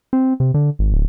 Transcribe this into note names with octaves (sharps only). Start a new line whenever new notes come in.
C4
C3
D3
G#1
D1